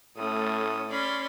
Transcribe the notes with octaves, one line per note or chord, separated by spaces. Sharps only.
A2 A3 C#4 A4 D#6
C#4 D5 B5 C6